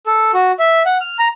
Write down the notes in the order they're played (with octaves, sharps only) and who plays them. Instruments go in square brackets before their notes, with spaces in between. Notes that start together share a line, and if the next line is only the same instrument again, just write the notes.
[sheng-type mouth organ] A4
F#4
E5
F#5
F6
A#5